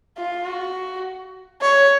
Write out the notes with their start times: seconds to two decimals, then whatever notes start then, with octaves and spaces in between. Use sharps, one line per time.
0.17 F4
0.46 F#4
1.61 C#5